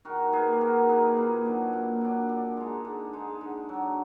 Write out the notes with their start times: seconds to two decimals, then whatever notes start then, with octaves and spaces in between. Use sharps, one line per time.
0.05 D#3 F#4 A#4
0.32 A#3 D#4 G#4 B4
0.53 G#4
0.61 D#3 F#4 A#4
0.89 A#3 D#4 G#4 B4
1.17 A#2
1.45 F#3 D4
1.73 A#2
2.01 F#3 D4
2.29 D3
2.57 G#3 D#4
2.85 D3
3.13 G#3 D#4
3.41 D3
3.69 F#3 D4